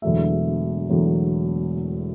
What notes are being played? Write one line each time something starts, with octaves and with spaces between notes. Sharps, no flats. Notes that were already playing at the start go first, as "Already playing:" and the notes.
E1 E2 D3 F#3 A3 E5
E1 E2 D3 F#3 A3